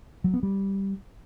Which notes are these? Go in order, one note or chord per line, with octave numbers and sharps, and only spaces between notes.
F#3
B3
G3